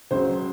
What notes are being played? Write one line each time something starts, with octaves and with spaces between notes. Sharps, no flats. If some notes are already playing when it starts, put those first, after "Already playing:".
C#2 C#3 F#3 C5